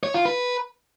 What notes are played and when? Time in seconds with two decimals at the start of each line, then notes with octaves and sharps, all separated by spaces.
0.03 C#5
0.14 F4
0.25 B4